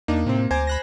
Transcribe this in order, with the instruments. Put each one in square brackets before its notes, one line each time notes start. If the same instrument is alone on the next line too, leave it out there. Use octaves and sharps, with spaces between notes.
[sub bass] E2 [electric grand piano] A#3 [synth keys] D4 D#4
[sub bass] A2 [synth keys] C3 C4
[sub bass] D2 [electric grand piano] C5 G#5 G#6 [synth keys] A#5 D6
[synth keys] B5 F#6 A#6